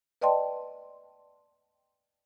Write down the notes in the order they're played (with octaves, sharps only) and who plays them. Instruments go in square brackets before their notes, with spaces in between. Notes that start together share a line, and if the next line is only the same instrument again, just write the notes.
[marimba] B4 D5 D#5 G5 A5 C6